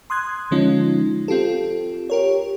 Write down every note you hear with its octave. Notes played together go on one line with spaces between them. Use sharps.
C6 D#6 F#6 G#6
D3 F3 G#3 C#4 D#4 F4
C4 F4 G4 A4
G4 A#4 C#5